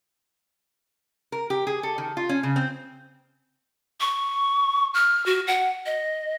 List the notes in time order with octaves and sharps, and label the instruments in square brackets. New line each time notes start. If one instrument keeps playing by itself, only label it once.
[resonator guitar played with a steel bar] A#4
G4
G#4
A4
D#3
F4
C#4
C#3
C4
[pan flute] C#6
F6
F#4
F#5
D#5